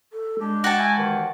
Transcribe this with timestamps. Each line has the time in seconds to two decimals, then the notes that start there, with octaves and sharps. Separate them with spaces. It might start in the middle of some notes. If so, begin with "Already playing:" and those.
0.13 A4
0.40 G#3 D4 G4
0.64 F#4 G5 A5
0.77 E4 G#5
0.98 D#2 D#3 E3